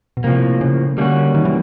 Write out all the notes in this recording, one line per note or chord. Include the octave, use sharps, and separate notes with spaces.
B2
A2 C3 F3 A#3
C#3
D3 G3 A#3 C#4 F#4
D#3
E3